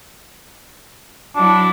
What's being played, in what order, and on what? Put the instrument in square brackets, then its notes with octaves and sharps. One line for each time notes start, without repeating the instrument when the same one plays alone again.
[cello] F#3 E4 [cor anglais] D4